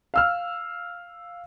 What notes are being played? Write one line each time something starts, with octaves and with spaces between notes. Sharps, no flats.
F5 E6 F6